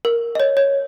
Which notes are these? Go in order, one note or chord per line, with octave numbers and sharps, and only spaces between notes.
A#4
D#5
C#5
C#5